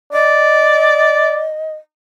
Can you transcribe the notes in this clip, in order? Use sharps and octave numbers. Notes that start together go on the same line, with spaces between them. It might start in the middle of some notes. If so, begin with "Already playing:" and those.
D5 D#5